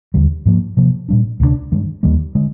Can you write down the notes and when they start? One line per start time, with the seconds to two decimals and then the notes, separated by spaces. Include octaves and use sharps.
0.14 D#2 D3 G3
0.46 G#2 F3 A#3
0.77 C3 F3 A#3
1.09 A#2 G3 D4
1.40 D2 C3 G3 D4
1.72 G2 D#3 G#3
2.03 D#2 D#3 G3 A#3
2.35 D3 G#3